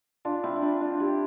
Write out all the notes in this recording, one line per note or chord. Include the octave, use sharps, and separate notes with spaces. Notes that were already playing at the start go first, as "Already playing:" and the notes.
D4 F4
C4 E4
E4
D4 F4
D4 F4
E4 G4